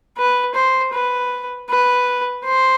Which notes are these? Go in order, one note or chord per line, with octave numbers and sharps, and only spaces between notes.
B4
C5
B4
B4
C5